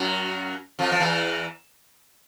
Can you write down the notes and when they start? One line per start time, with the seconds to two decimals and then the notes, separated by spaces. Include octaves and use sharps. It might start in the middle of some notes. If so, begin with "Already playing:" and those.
Already playing: F#2 F#3
0.79 F2 F3
0.92 F3
1.00 E2 E3